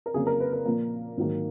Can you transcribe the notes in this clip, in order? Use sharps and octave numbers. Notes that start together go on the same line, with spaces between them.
A#4
F2 C#3 F#3 A#3 G#4
A#4
B4
A#4
A#2 F3 A#3
G#2 D#3 F#3 A#3